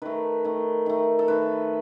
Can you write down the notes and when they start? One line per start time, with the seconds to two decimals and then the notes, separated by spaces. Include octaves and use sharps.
0.02 D#3 A3 B4
0.44 D#3 A3
0.86 D#3 A3
1.19 A4
1.28 D#3 A3 B4